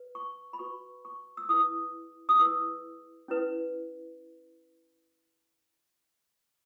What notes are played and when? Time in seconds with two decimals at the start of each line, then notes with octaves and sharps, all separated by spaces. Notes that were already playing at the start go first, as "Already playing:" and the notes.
Already playing: B4
0.15 C#6
0.53 B5
0.59 F#4 B4 C#6
1.05 C#6
1.37 E6
1.49 E4 G#4 B4 D#6
2.29 D#6
2.39 E4 G#4 B4 E6
3.28 C#4 E4 B4